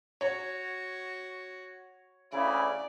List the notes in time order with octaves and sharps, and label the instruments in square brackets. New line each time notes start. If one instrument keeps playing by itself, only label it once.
[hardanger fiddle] F#4 [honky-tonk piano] C#5
[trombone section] D2 C#3 E4 [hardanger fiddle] D5